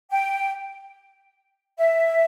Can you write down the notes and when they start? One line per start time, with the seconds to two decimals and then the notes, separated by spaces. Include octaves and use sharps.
0.11 G5
1.78 E5